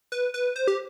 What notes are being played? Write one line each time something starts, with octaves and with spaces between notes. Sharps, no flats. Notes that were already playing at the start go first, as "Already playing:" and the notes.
B4
B4
C5
G4